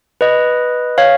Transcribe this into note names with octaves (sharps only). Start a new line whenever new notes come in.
B4 D#5
C#5 F5